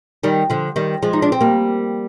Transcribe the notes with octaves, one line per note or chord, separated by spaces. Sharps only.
D#3 G3
D3 F3
D#3 G3
F3 G#3
D#4
D4
C4
G3 A#3